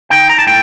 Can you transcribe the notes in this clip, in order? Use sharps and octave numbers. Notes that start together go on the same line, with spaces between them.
D#4 G5
A#5
A5
A2 G5